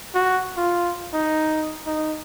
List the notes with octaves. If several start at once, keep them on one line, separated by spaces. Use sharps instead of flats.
F#4
F4
D#4
D#4